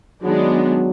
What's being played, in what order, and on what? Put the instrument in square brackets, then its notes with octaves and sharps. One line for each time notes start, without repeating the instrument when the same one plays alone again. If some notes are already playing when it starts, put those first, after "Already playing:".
[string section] D#3 G#3 B3 D4 [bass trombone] F#3